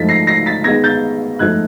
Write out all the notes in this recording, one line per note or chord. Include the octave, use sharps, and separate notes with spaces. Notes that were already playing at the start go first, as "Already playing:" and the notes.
Already playing: G#2 F3 A3 A6 B6
A#6 C7
A#6 C7
A6 B6
D#3 G#3 B3 G#6 A#6
G6 A6
G#2 F3 A3 F#6 G#6